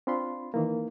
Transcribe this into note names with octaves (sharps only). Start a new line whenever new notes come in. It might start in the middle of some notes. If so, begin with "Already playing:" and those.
C4 D4 F4 B5 C6
D#3 E3 A#3